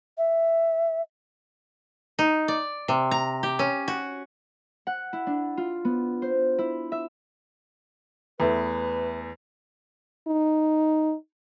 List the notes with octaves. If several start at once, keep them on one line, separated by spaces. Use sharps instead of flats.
E5
D#4
D5
C3
A#5
G4
C#4
F#4
F#5
E4
D4
F4
B3
C5
E4
E5
E2 A3 B4
D#4